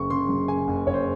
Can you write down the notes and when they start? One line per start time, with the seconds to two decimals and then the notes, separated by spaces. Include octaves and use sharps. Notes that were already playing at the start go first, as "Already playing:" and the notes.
Already playing: F#1 C#3 C#6
0.10 C#3 C6
0.29 F#2
0.48 C#3 G#5
0.68 F#1
0.87 F#1 C#5
0.94 C5